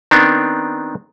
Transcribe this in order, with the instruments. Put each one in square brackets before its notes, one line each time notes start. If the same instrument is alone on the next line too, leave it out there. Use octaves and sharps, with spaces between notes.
[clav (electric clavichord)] D#3 B3 C4 D4